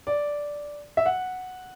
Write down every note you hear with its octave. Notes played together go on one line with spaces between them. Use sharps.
D5
E5
F#5